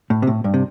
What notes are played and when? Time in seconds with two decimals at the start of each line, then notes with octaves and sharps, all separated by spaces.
0.10 A2
0.22 C3
0.27 A2
0.44 G2
0.54 C3